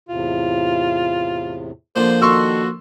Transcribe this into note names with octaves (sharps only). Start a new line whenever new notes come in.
E2 A2 C3 F4
D3 F3 A#3 C5
D#3 F#4 A4 C6 C#6 E6